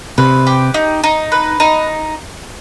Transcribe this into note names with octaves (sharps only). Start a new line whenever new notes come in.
C3 B4
G4
D#4
D#4
B4
D#4